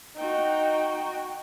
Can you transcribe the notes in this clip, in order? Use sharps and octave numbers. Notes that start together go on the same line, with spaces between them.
D#4 F#4 G5